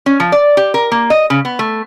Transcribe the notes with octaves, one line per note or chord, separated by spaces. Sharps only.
C#4
F3
D5
G4
A#4
A#3
D#5
C#3
B3
A3